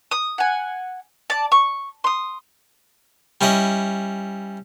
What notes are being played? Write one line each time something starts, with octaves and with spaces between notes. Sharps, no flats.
D#6
F#5 G#5
D5 A5
C#6
C6 D#6
G3 C#4 E4 D#5